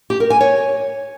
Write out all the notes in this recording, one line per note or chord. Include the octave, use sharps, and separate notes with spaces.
G4
A#4
G#5
C#5